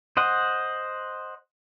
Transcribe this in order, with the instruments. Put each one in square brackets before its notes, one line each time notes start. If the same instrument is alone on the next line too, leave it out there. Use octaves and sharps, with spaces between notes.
[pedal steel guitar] C5 D#5 F#5